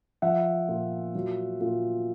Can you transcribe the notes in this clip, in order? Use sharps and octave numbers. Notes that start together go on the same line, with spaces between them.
F3 E5 F#5
A#2
F#3
A#2